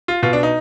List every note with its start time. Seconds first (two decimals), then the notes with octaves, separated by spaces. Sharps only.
0.08 F4
0.23 B2 F4
0.33 D4
0.43 D#4